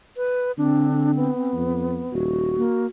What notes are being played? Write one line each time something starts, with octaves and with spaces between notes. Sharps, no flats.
B4
D3 C4 D4
B3
F2
D#1 F#4
A#3